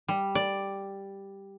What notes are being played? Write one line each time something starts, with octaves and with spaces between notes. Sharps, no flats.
G3
D5